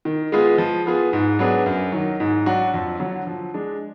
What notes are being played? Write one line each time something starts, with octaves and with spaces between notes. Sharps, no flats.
D#3
G#3 B3 F4 G#4
F3
B3 F4 G#4
G#2
F#3 B3 D4 G#4
F#2
D#3 F#3
G#2
F#3 D4 F#4
F2
D3 F#3
F3
G#3 D4